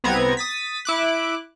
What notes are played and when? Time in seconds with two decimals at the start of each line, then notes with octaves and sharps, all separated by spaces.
0.04 C2 B3 C4 A#5 G#6
0.37 D#6 A6 B6
0.85 E4 D6 F#6